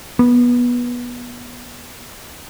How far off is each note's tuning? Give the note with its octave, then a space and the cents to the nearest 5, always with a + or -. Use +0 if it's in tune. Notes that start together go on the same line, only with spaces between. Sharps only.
B3 -20